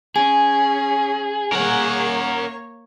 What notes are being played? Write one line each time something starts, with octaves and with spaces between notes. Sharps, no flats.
C#4 G#4 G#5
A#3 A#4 C#5 F#5